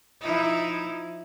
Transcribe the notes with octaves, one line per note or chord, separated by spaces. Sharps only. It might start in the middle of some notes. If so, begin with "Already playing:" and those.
F3 D#4 E4